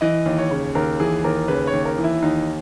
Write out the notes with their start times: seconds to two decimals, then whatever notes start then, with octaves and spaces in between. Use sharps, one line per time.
0.01 E3 D#5
0.26 D#2
0.38 C#5
0.51 C#3
0.75 D#2 A#4
1.00 E3 G#4
1.24 D#2 A#4
1.48 C#3 B4
1.67 C#5
1.73 D#2
1.85 A#4
1.98 E3
2.04 E4
2.22 D#2 D#4